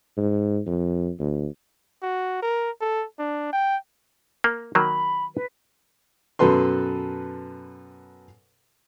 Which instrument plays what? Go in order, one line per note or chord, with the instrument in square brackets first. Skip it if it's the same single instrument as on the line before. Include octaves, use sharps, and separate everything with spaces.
[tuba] G#2
F2
D2
[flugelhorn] F#4
A#4
A4
D4
G5
[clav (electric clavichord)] A#3
[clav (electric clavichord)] D#3 F#3 A#3 [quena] B5
[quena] B4
[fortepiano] F#2 B2 A4 B4 C6